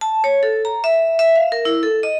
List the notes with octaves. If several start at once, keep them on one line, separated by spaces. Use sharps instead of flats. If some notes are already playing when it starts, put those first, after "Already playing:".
A5
C#5
A4
A#5
E5
E5
F5
A#4
E4
A4
D#5